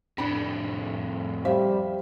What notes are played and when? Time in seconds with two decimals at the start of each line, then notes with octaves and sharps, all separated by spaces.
0.18 F2 A2 D4 G5 B5
1.45 G3 C5 E5 F5